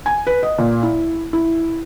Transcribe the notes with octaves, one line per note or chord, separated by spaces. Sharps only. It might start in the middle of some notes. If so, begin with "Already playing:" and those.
G#5
B4
D#5
A#2
E4
E4